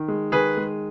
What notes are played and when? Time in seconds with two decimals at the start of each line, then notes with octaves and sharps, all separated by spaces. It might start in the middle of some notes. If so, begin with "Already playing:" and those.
Already playing: D#3
0.08 G#3
0.32 D#3 G#4 B4
0.57 G#3